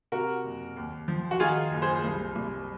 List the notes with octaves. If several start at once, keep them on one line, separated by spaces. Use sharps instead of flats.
C3 F#4 A#4
F#1
D#2
F3
F#4
D#3 F4 G#4
F#1
G#4 C5
C2
C2